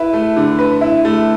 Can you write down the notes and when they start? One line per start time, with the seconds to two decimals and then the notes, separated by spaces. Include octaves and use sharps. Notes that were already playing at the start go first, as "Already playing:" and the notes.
Already playing: E4 B4
0.13 A3
0.36 D3
0.59 B4
0.81 E4
1.05 A3